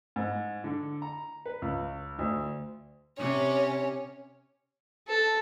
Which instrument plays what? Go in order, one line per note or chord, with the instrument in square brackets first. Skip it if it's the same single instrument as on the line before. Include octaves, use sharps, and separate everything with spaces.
[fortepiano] G#2
D3
A#5
B4
C#2
D2
[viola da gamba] C3 [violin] C#4 C#5
[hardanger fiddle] A4